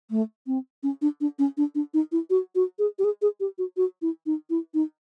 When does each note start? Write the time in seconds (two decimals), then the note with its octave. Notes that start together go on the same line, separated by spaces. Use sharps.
0.10 A3
0.47 C4
0.83 C#4
1.02 D4
1.21 D4
1.39 C#4
1.57 D4
1.75 D4
1.94 D#4
2.12 E4
2.30 F#4
2.55 F#4
2.79 G#4
2.99 G4
3.04 G#4
3.22 G#4
3.40 G4
3.58 F#4
3.77 F#4
4.02 E4
4.26 D#4
4.50 E4
4.74 D#4